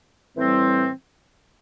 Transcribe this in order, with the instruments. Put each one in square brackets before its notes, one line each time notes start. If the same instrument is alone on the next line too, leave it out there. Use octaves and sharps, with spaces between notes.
[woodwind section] A2 E3 G3 C4